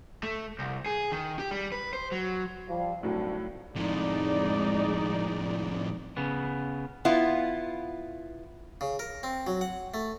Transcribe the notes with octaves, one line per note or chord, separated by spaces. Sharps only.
A3
C2
G#4
D#3
G4
G3
B4
C5
F#3
F3 G3 F5
C2 A2 F#3 G3 D4 D#4
F2 A2 G#3 D#4 D5
C#3 B3
B3 E4 F4
C#3
A#4
C4
F#3
F#5
A3